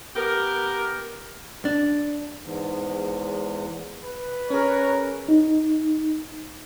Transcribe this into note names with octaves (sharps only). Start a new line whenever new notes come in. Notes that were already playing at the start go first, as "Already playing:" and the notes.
B3 G4 A#4
D4
E2 G#2
B4
C#4 G#4 A#4 C#5
D#4